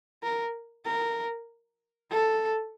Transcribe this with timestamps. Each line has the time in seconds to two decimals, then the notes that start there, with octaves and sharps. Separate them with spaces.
0.23 A#4
0.85 A#4
2.11 A4